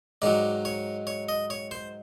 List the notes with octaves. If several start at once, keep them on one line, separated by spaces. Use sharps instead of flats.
G#2 D#3 F#3 D5
C#5
C#5
D#5
C#5
C5